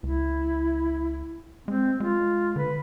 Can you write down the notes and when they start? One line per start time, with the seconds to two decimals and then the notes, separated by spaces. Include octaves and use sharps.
0.03 C#2 E4
1.68 G#3 C4
2.00 G#3 F4
2.56 D3 B4